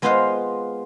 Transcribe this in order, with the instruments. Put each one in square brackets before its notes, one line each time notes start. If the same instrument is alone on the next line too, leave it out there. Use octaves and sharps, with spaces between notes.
[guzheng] G#3 B3 F4 B4 C5 F5